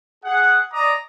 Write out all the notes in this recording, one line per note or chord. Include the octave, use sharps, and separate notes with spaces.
G#4 F#5
D5 D#5 A#5 D6 D#6